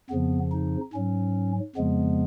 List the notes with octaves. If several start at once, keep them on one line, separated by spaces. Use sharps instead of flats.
F2 C#3 F3 B3
D#4
G#2 F#3 C#4
F2 C#3 F3 G#3 B3